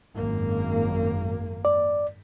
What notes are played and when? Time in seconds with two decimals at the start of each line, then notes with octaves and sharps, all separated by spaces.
0.16 G#1 F#2 A#3
1.65 D5